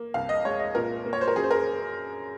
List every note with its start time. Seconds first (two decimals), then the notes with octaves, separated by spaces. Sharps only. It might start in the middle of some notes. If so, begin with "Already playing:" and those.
Already playing: A#3
0.14 C2 F5
0.29 D#5
0.45 G#3 C#5
0.59 D#5
0.75 A#2 A#4
1.06 A#3
1.13 C#5
1.21 C5
1.28 A#4
1.36 F#2 G#4
1.44 C5
1.51 A#4